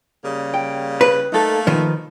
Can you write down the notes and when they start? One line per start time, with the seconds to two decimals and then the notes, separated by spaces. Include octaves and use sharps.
0.24 C#3 G3 A#3
0.54 G5
1.01 B4
1.32 A3 A#3 D#4 A4
1.67 D#3 F3 B4